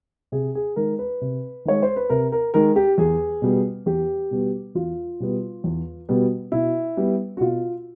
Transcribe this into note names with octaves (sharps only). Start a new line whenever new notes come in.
C3 G#4
G#4
D#3 G#3 A#4
B4
C3
D#3 G#3 C#5
C5
B4
C3 A#4
A#4
D#3 G#3 A#4
G4
E2 G#4
B2 G3 B3
E2 G4
B2 G3 B3
E2 F4
B2 G3 B3
E2
B2 G3 B3
B2 E4
G3 B3
F#4
B2 F4